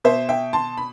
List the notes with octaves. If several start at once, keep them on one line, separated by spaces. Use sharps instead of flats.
B2 C5 E5
E5 G5
A5 C6
B5